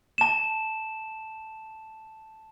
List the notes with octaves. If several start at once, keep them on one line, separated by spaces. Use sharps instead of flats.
A5 E7